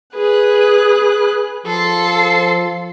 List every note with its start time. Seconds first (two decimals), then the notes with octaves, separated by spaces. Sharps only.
0.14 G#4 B4 F#6
1.66 F3 A4 C6